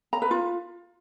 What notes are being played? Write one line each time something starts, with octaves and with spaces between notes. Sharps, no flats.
A#5
B4
F4